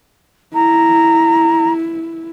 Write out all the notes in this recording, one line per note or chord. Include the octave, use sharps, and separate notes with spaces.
E4 A#5